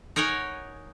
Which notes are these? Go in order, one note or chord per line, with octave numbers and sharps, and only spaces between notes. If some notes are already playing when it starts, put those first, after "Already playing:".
D#4 A#4 C#5 F#5 G#5